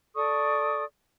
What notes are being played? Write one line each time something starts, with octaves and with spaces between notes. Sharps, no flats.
A4 D5 C#6 D#6